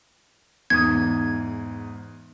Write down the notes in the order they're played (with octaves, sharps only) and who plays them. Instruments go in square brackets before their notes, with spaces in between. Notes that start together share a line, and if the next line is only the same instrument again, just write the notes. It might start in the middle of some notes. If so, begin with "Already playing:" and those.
[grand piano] E2 G#2 D#6 [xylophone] G#6